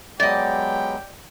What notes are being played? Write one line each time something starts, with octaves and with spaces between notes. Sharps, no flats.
F#3 G#3 B3 G4 D5 D#5 G5